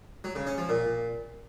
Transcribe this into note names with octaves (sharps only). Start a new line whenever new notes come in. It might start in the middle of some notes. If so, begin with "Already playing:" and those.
F#3
C#3
C#4
F3
A#2